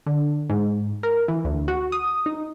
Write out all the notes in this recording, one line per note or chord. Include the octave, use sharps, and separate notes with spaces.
D3
G#2
A#4
E3
D2
F#4
D#6
D#4